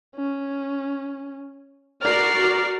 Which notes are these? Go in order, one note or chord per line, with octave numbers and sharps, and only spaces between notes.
C#4
F#4 A#4 D5 F6 C7